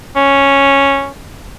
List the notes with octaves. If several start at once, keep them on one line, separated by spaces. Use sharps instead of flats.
C#4